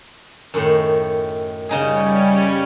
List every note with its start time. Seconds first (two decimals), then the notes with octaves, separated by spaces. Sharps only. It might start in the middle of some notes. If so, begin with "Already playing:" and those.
0.54 F#2 A2 D#3
1.69 C#3 G3 C#4 D#4 G#4